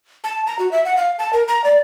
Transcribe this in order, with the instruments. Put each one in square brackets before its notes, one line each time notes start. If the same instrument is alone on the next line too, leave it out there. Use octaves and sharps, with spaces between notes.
[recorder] A5
A#5
F#4
E5
F#5
F5
A5
A#4
A#5
D5